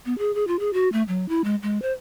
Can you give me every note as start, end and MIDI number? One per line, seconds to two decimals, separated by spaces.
0.06 0.16 59
0.18 0.31 68
0.35 0.44 68
0.48 0.59 65
0.59 0.70 68
0.73 0.89 66
0.93 1.03 57
1.08 1.28 54
1.29 1.42 64
1.44 1.55 56
1.63 1.81 56
1.82 1.92 72